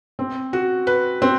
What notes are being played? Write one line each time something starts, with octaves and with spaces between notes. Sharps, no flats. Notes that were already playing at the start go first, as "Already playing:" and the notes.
C4
F#4
B4
C4